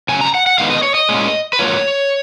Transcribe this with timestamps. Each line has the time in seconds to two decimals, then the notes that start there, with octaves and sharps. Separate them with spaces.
0.09 C#3 F#3 A#3 C#4 G#5
0.21 A#5
0.35 F#5
0.47 F#5
0.59 D#3 G#3 B3 D#4 F5
0.71 D#5
0.83 C#5
0.95 D#5
1.09 A#2 G#3 C#4
1.53 B4
1.59 G#2 F#3 A#3 F4 C#5